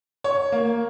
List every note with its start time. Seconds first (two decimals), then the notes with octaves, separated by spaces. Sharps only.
0.24 C#5
0.52 A#3